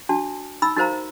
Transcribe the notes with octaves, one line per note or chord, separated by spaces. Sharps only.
D4 F#4 A5
D#4 B5 E6
D#4 F#4 A#4 C5 F5 A#5